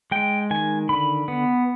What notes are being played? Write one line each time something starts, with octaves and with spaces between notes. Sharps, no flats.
G#3 G5
D#3 G#5
D3 B5
B3